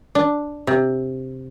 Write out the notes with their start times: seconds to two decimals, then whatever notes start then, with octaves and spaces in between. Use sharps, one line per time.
0.15 D4
0.67 C3